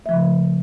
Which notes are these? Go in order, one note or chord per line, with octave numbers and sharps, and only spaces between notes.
C#3 F3 A3 E5